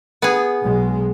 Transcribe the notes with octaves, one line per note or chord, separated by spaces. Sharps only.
B3 G#4
B1 G#3